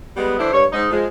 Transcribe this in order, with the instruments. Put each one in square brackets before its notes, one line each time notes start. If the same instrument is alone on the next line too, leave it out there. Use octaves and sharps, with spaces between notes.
[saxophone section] G3 G#3 B3
E3 D4 E4 A4 C5
G2 C#5
G#2 D#4
F3 G#3